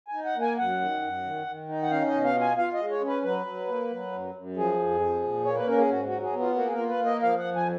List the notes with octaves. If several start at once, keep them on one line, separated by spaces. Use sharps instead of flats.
G#5
D#4
F#5
A#3
G#5
F#2 F#5
D#3
F#2
D#3
D#3
D#4
F#5
C#4 F5
D#5
B2
F5
F4
G#5
F4 F5
D#5
G#3
C#5
C#4
B4
F#3 B4
F#3
A#3
F#3
F#2
F#2
F3 G#4
F2
F3
A#2
A#3 C#5
B4
C#4 A#4
G#4
G#2 F#4
F#4
F#3
G#4
B3
F4
A#3 F#4
G#4
A#4
F4
B4
A#3
D#5
F3 F5
F#5
F2
G#5